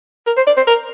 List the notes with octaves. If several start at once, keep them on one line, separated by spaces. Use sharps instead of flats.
A#4
C5
D5
C5
A#4